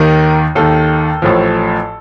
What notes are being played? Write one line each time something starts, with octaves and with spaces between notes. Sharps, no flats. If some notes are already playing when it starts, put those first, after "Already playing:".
Already playing: D#2 D#3 A#4
D#2 D#3 A4
A1 A2 F3